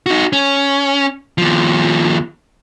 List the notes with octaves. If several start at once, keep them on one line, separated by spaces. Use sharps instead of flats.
D#4 F#4
C#4
D#2 F3